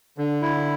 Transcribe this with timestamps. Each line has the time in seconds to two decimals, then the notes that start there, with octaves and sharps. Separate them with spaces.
0.18 D3
0.42 E4